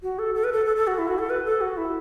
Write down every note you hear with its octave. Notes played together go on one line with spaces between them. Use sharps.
F#4
A4
A4
B4
A4
A4
A4
F#4
E4
F#4
A4
B4
A4
F#4
E4